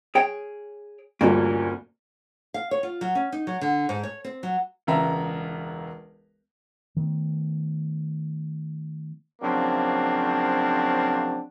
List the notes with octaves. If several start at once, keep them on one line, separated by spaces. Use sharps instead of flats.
G#4 C#5 G5
D2 G2 A#2 A#3 C#4
F5
C#5
F4
F#3
C#4
D#4
F#3
D3
G#2
C#5
C4
F#3
E1 C#2 E5 A#5
D#3 A3 B3
C#3 F3 F#3 A#3 C4 D4